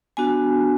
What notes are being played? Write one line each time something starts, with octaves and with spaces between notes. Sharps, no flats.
B3 D4 F#4 G#5